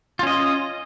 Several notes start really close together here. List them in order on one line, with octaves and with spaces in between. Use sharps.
F4 C#4 D#5